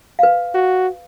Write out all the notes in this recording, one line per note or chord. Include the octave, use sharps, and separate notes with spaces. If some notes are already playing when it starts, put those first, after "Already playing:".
B4 F5
F#4